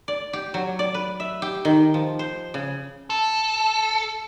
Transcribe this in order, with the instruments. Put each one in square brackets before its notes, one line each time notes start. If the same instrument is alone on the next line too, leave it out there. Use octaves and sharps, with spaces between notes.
[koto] D5
G4
F#3
D5
B4
E5
G4
D#3
F3
C5
C#3
[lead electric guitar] A4